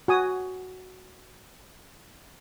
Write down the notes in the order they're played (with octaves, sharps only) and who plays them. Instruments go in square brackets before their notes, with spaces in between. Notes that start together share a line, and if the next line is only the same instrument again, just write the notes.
[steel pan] F#4 G#5 D#6